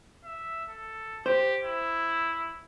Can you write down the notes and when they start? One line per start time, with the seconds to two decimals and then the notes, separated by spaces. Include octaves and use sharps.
0.25 E5
0.69 A4
1.26 G4 C5
1.64 E4